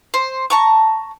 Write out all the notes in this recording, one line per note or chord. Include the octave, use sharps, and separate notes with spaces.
C5
A5 A#5 C#6